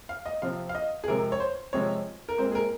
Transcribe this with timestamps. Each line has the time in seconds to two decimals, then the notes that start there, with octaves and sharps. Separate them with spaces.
0.09 F5
0.26 D#5
0.42 C3 F3 C4 F5
0.69 F5
0.75 D#5
1.04 G#4
1.08 C3 F3 G#3 C4 A#4
1.32 C#5
1.40 C5
1.73 C3 F3 G#3 C4 C#5
2.29 A#4
2.38 A#2 G#3 C4 C5
2.52 G#4
2.55 A#4